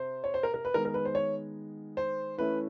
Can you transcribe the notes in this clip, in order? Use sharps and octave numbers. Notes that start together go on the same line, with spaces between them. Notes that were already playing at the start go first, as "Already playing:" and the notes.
Already playing: C3 C5
C#5
C5
A#4
A#4
B4
D#3 G#3 B3 D#4 A#4
A#4
B4
C5
C#5
C5
E3 A3 C#4 E4 B4